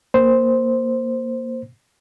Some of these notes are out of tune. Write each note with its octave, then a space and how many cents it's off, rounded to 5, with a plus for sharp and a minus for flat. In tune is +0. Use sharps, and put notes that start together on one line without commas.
A#3 +0 C5 +0